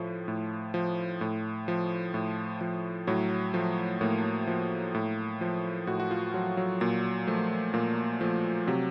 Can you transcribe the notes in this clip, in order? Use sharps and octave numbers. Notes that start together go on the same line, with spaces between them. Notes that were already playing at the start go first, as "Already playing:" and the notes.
Already playing: A2 F3
A2
F3
A2
F3
A2
F3
A2 F#3
F3 A3
A2 A#3
F3
A2
F3
A2 F#4
F#4
F4
F3 F#3
F#3
A#2 F#3
F3 A3
A#2 A#3
F3 A3
C3 F#3